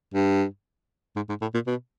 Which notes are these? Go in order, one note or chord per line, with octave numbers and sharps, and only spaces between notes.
G2
G#2
G#2
A2
A#2
B2